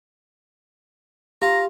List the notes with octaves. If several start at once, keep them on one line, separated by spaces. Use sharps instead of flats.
F4 G4 A#5